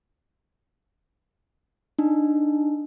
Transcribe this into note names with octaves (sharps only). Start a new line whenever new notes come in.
D4 D#4